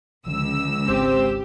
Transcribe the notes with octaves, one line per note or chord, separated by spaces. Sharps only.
C#2 D3 D#3 F3 E6
G#1 C4 G4